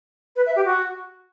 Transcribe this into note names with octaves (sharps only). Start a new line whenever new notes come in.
B4
E5
G4
F#4